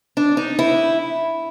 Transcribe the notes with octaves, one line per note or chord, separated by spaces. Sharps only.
D4
D#4
E4